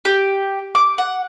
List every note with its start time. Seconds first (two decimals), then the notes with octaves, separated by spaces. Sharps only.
0.05 G4
0.75 D6
0.98 F#5